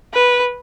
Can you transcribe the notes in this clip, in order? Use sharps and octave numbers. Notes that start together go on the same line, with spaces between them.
B4